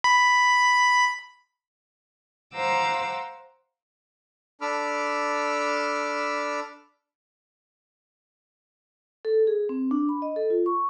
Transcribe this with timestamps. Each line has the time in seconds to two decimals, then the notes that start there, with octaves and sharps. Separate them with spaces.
0.04 B5
2.54 C5 F5 F#5 A#5 D6 E6
4.61 D4 A4 B5 D6 E6 F6
9.25 A4
9.47 G#4
9.69 C4
9.91 D4
10.09 B5
10.22 D#5
10.36 A4
10.50 F4
10.66 C#6